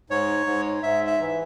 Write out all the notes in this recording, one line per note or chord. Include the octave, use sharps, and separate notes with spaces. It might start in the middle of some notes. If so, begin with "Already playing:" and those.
G#2 C#5
G#2
G#2 E5
E5
E3